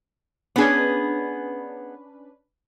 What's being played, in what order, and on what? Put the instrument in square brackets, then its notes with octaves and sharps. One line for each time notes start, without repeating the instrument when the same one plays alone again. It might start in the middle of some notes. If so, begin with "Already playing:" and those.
[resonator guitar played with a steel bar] B3 G#4 [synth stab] C#4 D4 B4